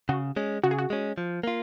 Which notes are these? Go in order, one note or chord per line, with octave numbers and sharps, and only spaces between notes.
C#3 F#4
G#3 C#4
C#3 F#4
G#4
F#4
G#3 C#4
F3
A#3 F4